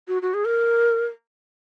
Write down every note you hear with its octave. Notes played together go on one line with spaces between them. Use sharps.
F#4
F#4
G#4
A#4